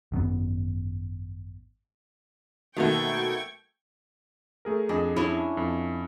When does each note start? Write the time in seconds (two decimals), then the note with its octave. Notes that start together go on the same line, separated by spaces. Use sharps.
0.12 G#1 F#2 D3 B3
2.77 B2 D#3 F#3 A3 A#3 G5 C#6 G#6
4.65 A3 G#4 A#4
4.89 F2 D4 G#4 D#5
5.17 C#4 D4 E4
5.57 F2